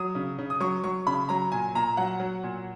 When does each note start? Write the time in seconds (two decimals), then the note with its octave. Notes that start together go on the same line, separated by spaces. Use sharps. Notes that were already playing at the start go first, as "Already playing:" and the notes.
Already playing: F#3 D#6
0.15 C#3
0.38 C#3
0.50 D#6
0.60 F#3 C#6
0.84 F#3 C#6
1.07 C#3 B5
1.29 F#3 A#5
1.52 A#2 G#5
1.75 A#2 A#5
1.97 F#3 F#5
2.20 F#3
2.43 A#2